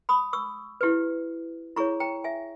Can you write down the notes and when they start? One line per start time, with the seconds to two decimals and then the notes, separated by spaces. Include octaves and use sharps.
0.09 B5 D#6
0.33 C#6 E6
0.81 E4 G4 B4
1.76 E4 G#4 C#5 A#5 C#6
2.00 G5 A#5
2.24 E5 G#5